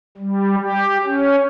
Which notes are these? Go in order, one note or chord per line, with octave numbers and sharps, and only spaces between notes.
G3
G4
C#4